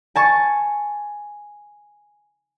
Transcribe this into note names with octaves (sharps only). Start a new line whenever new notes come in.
G#5 A5 C#6